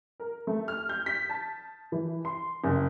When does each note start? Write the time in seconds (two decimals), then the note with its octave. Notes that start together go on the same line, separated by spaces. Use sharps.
0.20 A#4
0.47 A3
0.68 F6
0.89 G6
1.06 B6
1.29 A5
1.92 E3
2.25 C6
2.64 F#1